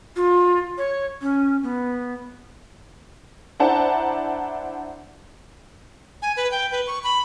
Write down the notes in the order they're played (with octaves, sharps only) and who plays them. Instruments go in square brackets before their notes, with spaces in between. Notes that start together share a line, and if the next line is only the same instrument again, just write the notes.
[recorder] F4
C#5
C#4
B3
[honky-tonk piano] D4 E4 C5 F#5 A5 A#5
[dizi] G#5
B4
G5
B4
C#6
B5